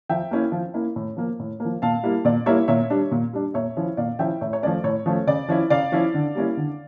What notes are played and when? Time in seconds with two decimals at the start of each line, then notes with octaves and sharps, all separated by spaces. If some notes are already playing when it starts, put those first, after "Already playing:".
0.09 F3 E5 G5
0.31 A#3 C#4 E4
0.52 F3
0.74 A#3 C#4 E4
0.96 A2
1.17 F3 A#3
1.39 A2
1.60 A#3
1.65 F3
1.82 A#2 F5 A5
2.03 G3 A#3 E4
2.25 A#2 D5
2.46 G3 A#3 E4 C#5 E5
2.68 A#2 C#5 E5
2.90 G3 D4
3.11 A#2
3.33 G3 D4
3.54 A#2 C#5 E5
3.77 F3 C#4 E4
3.97 A#2 D5 F5
4.19 F3 C#4 E4 E5 G5
4.41 A2 C#5 E5
4.53 C#5
4.63 F3 A3 C#4 D5
4.84 A2 C#5
5.06 F3 A3 C#4
5.27 C#3 D5
5.49 F3 C#4 E4
5.70 C#3 D5 F5
5.92 F3 C#4 E4
6.14 D3
6.35 G3 A#3 C#4 E4
6.57 D3